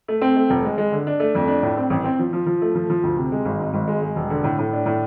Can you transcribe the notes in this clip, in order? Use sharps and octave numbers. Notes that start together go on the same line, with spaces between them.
A3
C4
A3
F1
G#3
G#3
D3
D4
A3
F2
D4
A2
C4
A1
C4
F3
F3
F3
A3
F3
F3
D2
C3
G#3
G#1
G#2
G#1
G#3
G#3
E1
D3
A2
A2
D4
A2